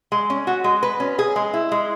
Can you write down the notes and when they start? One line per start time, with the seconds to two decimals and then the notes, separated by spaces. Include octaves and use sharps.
0.12 G#3
0.30 C#4
0.47 F#4
0.64 G#3
0.83 B4
1.00 C#4
1.19 G#4
1.36 G#3
1.54 E4
1.72 G#3